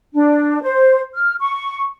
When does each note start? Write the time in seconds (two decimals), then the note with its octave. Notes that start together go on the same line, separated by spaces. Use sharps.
0.14 D4
0.62 C5
1.14 F6
1.40 C#6